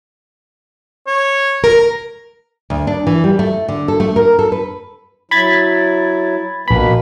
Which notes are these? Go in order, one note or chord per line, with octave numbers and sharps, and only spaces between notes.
C#5
A#4
D2
D4
E3
G3
A3
D3
A4
A3
A#4
A4
B4
F#3 E4 B5 G#6 A6
A#1 B2 A#3 B4 B5